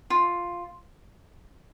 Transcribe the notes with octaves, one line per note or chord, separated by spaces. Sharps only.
F4